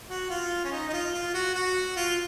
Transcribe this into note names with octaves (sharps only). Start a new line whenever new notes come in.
F#4
F4
C#4
D#4
D#4
F4
F4
F#4
F#4
F4